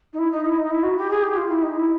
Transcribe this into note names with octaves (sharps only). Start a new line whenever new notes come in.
D#4
E4
D#4
E4
D#4
E4
F#4
G4
G#4
G4
F4
E4
D#4
E4